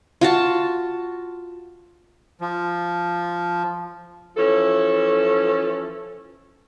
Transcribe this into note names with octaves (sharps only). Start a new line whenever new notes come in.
F4 F#4 A5
F3
E3 F3 C#4 A4